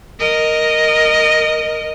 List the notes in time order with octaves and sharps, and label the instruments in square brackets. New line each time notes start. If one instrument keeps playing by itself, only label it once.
[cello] A#4 D#5